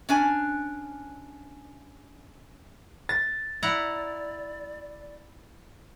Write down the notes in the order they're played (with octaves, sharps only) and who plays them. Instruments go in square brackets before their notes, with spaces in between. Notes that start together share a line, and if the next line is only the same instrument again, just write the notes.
[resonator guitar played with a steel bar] C#4 D4 G#5
[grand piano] A6
[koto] E4 F#5 A#5 [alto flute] D5